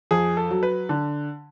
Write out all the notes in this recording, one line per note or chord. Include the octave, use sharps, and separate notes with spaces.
F2 G#4
A4
F#3
B4
D3